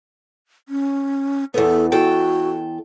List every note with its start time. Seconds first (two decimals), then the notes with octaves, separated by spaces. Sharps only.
0.69 C#4
1.54 E2 B3 A4
1.92 E2 F#4 A4 G5